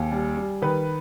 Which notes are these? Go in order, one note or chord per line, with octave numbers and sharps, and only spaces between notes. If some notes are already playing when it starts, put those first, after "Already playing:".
Already playing: D#2 G#4
G3
G3
D#3 B4